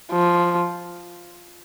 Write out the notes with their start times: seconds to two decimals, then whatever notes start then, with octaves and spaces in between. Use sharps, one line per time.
0.11 F3